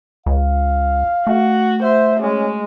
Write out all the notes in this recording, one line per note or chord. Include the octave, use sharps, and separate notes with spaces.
C#2 F5
A3 F#4
C5 E5
G#3 C#4